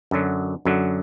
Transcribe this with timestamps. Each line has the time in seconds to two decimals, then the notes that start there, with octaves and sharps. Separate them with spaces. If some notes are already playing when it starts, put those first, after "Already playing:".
0.11 F#2 D3 F#3
0.65 F#2 D3 F#3